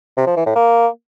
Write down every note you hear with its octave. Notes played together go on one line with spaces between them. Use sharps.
C3
F3
E3
A2
A#3